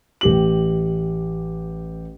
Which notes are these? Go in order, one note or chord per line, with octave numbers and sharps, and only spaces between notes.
A1 G4 F#7